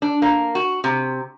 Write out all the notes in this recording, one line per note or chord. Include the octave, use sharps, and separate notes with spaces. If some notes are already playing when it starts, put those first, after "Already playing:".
D4
A#3
F#4
C3